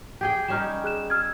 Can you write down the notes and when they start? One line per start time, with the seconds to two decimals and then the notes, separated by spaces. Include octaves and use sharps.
0.21 G4 G#4 G5
0.48 G3 C#4 D#4 F6 E7
0.84 G#4 F#6 E7
1.10 E6 F6 G#6